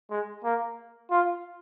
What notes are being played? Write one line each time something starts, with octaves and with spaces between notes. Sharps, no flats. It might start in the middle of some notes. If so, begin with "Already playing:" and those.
G#3
A#3
F4